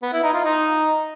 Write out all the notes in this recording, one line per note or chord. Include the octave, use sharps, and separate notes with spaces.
B3
E4
D#4
F4
D#4